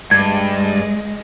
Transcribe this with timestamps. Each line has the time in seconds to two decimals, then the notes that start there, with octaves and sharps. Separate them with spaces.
0.11 G2 G#3 G#6